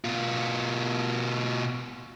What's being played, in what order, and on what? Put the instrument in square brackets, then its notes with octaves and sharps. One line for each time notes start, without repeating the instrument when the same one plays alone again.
[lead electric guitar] B2 F4